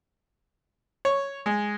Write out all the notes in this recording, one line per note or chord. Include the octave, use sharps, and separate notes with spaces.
C#5
G#3